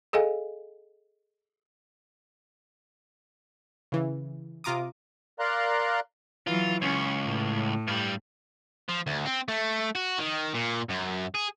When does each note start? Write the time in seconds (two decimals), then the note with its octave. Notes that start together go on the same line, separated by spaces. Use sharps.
0.13 G#4 A4 D#5 F5 G#5
3.92 C#3 E3
4.64 C3 F4 A#5 D6 D#6
5.39 A#4 D5 F5 A#5 C6 F#6
6.47 E3 F#3 F4
6.82 C#2 C#4
7.25 A2
7.88 G2 G3
8.89 F3
9.07 D2
9.26 C4
9.48 A3
9.95 F#4
10.19 D#3
10.55 A#2
10.90 F#2
11.35 G#4